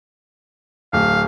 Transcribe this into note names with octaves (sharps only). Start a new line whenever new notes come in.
D1 F5